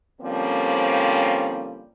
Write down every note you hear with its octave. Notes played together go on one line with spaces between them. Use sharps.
D3 F3 G3 A#3 C4 C#4